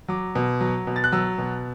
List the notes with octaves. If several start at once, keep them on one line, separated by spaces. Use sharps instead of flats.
F#3 D6
B2
F#3
B2
A6
F#6
F#3 E6
B2